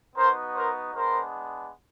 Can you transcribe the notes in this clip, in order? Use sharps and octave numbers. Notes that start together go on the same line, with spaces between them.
B3 D#4 F#4 A#4 C5
A#4 C5
G#3 B3 D4 A#4 C5